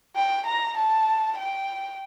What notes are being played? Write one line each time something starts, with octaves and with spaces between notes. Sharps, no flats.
G5
A#5
A5
G5